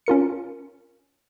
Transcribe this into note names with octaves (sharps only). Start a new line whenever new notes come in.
C#4 F4 A#4 C#7